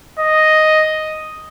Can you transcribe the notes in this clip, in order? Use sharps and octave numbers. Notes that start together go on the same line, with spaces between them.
D#5